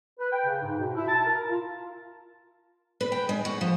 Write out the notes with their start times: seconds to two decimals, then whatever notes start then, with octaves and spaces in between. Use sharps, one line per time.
0.19 B4
0.32 G5
0.45 C#3
0.62 G#2
0.78 B2
0.95 E4
1.08 A5
1.25 A#4
1.49 F4
3.01 B4
3.12 G5
3.29 G#3
3.45 F#4
3.61 F3